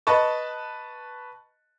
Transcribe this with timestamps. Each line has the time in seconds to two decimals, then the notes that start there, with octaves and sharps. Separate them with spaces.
0.07 B4 D#5 A5 C#6